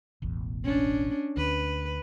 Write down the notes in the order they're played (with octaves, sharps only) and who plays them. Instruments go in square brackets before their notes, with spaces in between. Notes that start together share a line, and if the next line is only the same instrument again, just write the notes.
[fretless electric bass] E1 A1 E2
[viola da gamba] C#4 D4
[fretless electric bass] D2 [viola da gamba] B4